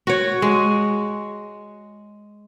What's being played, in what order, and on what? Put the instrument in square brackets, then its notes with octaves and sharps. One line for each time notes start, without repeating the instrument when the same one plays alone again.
[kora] F#4 C#5
G#3